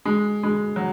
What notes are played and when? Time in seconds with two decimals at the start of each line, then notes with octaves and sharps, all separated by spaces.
0.05 G#3
0.43 G#3
0.76 F#3